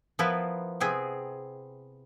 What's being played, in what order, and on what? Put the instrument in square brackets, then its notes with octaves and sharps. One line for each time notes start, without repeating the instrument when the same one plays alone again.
[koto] F3 B3 E4 F4 A#4 B4
C3 B3 C4 G#4